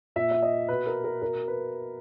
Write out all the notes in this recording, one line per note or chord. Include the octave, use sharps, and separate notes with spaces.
A#2 E5
E5
D#5
B2 B4
A#4
A#4
B2 A#4
B4